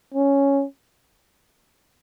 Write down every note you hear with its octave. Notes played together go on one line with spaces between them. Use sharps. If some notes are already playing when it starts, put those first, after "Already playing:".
C#4